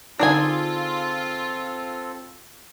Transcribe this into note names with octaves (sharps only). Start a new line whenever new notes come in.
D3 C4 D4 D#4 F4 G#4 A4 G#5